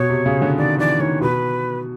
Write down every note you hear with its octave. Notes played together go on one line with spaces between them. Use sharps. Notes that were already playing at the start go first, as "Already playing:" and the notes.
Already playing: B2 C#5
C3
C#3
D3
D#3 D5
E3 D5
D#3 C#5
B2 B4